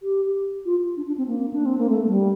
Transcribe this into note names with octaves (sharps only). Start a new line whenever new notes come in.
G4
F4
D4
D4
C4
A#3
D4
C4
A#3
A3
G3